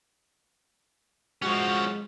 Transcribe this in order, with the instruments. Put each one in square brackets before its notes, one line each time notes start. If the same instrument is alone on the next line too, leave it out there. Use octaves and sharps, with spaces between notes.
[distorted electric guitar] F3 C#4 [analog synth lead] G#3 [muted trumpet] F#4